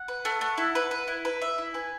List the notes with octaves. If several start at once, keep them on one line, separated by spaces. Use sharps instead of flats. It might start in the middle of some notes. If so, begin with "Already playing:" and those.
Already playing: F#5
B4
A3
A3
E4
B4
B4
E4
B4
E5
E4
B4 G#5